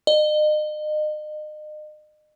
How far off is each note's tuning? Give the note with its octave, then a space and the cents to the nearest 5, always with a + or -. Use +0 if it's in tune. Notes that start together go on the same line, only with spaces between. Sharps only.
D#5 -35